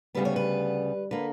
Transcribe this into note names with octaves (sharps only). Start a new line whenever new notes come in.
D2 C#3 G3 B3 B4
C#5
B4
D3 A#3 B4